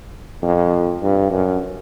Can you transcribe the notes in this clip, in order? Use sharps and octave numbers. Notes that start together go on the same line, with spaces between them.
F2
G2
F#2